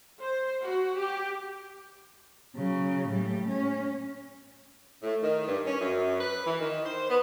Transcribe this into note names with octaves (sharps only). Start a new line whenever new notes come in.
C5
F#4
G4
C#3 F#3
A2 G3
C#4
A2
D#3
G2
C#4
F#2
B4
E3
D#3
C5
B3